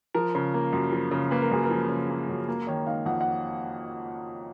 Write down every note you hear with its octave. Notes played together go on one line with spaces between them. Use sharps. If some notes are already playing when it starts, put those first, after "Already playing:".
F3 A#4
C#3
A#3
F#2
F3
C#3
A#3 B4
A#4
F#2 G#4
A#4
F3
C#3
A#3
F#2
A#3
D#3 C#5
D#4 F5
F2 F#5
F#5